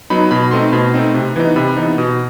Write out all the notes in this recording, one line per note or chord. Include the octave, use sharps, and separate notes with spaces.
F#3 B3 D#4 B5
B2 B5
A3 C4 D#4 C6
B2 B5
A3 C4 D#4
C3
E3 B3 D#4
C3 B5
E3 B3 D#4
B2